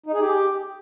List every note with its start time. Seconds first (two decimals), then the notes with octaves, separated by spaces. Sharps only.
0.06 D#4
0.13 G#4
0.20 G4